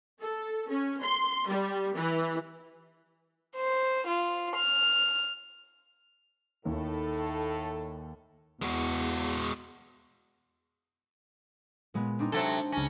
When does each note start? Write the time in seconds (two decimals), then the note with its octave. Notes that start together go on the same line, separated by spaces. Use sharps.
0.21 A4
0.69 C#4
1.00 C6
1.47 G3
1.95 E3
3.56 C5
4.07 F4
4.56 F6
6.65 D#2 A2 D#3 A4
8.62 E2 G#3 F#4
11.94 A#2 G#3 B3
12.19 C4 D4 D#4
12.32 C3 F#3 A4 C5 A5 G#6
12.72 C#2 C#4 A#6